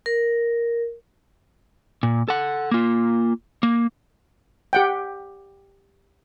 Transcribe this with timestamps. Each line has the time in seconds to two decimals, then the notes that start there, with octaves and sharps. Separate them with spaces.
0.06 A#4
2.03 A#2
2.28 A4 F#5
2.71 A#3 F4
3.63 A#3
4.73 G4 F#5 G5